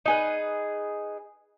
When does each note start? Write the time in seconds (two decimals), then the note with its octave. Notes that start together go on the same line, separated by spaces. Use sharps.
0.05 D#4 G#4 B4